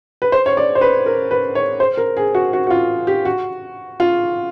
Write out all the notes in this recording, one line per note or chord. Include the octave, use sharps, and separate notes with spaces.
B4
C5
C#5
D5
C5
B4
A#4
B4
C#5
C5
A#4
G#4
F#4
F#4
F#4
F4
G4
F#4
F4